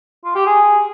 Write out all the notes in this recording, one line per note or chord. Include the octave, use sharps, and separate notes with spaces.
F4
G4
G#4